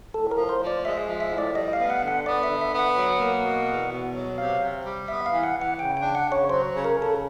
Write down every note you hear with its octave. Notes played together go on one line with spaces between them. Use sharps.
A2 A4
A#4
F3
C5
F3
D5
G#3 E5
F3
E5
A2
D5
G3 D#5
F5
B3
F#5
D3
F#5
B3 D5
E5
D3
E5
B3
F#5
F#3
A#3
B2
E2
B2
F#3
C3 F5
C3
G3
B3 E5
F5
E3
F#5
E3
F#5
C#3 G5
G5
D4
F#5
C#3
C#5
F#3 C5
C#3
A#4
C#3
A4